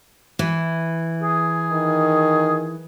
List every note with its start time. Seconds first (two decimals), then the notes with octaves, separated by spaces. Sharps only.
0.39 E3
1.23 G#4
1.73 D#3